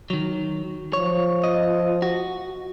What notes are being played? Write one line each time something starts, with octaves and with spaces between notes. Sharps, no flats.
D#3 F#3
F3 C#5
D#5
F#4